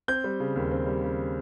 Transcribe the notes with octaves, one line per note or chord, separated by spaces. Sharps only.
C4 G6
G3
C#3
D#2
C4
G3
C#3